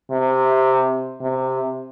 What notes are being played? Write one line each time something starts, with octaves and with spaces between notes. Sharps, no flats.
C3
C3